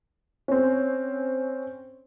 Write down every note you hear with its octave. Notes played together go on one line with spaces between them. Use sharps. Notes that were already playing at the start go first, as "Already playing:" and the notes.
C4 C#4